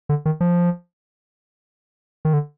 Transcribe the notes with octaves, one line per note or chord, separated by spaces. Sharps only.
D3
D#3
F3
D#3
D3